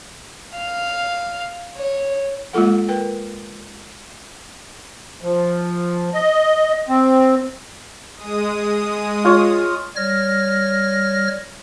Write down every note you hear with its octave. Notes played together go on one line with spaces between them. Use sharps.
F5
C#5
G#3 A#3 F4 A4 F#5
A#4 B4 G5
F3
D#5
C4
G#3 D#6
F4 C#5
G3 C#5 F6 A#6